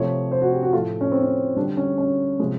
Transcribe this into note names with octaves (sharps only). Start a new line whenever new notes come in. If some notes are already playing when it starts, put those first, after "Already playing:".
Already playing: C3 F3 A3 C#5
C5
F#4
G4
F#4
A2 F3 A3 F4
C#4
C4
C#4
D3 G3 D4
C#4
C#4
C3 F3 G#3